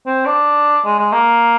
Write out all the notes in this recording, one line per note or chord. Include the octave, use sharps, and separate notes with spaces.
C4
D4
G#3
G#3
A#3